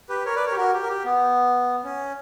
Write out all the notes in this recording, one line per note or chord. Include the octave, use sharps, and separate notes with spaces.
G4 B4
A#4 C#5
B4 D5
A#4 C#5
G4
F#4 A#4
G4
A#4
G4
B3
C#4